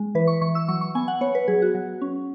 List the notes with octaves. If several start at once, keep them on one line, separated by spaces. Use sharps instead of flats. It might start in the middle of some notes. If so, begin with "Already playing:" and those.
Already playing: G#3
E3 B4
C#6
E3 C#6
E6
F#3 C#6
C#6
B3 G#5
F#5
B3 C#5
B4
F#3 G#4
F#4
F#3
C#4